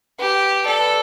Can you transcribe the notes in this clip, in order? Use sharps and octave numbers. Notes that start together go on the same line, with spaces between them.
G4 B4
A4 D5
B4